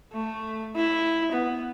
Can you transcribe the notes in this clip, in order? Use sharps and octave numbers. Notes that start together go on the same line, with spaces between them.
A3
E4
B3